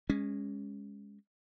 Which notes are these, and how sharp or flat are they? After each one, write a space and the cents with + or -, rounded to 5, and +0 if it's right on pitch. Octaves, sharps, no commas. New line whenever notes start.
G#3 -20 C#4 +0